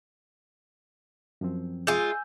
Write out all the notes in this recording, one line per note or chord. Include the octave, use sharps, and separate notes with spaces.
F#2 F3 C4
G#3 F4 G#5 E6 G6